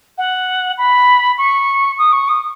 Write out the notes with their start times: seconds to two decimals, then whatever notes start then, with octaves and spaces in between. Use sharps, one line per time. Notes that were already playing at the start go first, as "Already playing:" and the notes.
0.18 F#5
0.78 B5
1.38 C#6
1.98 D#6
2.12 C#6
2.28 D#6